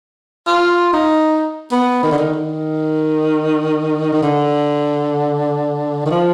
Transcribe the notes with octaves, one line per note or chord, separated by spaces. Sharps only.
F4
D#4
B3
D#3
D3
D#3
D#3
D#3
D3
D#3
F3